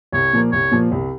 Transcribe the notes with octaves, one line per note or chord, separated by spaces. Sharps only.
C2 C#5
A#2 F3 A#3
C2 C#5
A#2 F3 A#3
C2